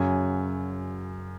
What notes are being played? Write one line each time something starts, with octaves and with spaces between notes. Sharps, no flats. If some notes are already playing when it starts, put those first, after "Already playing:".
Already playing: F#2 C#3 F#3 G#5